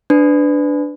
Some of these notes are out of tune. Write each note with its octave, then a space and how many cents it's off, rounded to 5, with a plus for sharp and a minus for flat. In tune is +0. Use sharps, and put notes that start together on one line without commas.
D4 +0 B4 +20